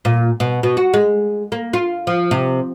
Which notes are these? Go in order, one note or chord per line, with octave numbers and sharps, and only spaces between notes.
A#2
B2
B2
F#4
G#3
A#3
F4
F3
C3